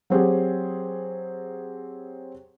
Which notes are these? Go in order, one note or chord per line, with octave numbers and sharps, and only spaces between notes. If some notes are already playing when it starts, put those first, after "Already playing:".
F#3 C4 G4 G#4